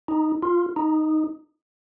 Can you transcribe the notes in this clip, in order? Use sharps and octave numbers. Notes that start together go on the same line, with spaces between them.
D#4
F4
D#4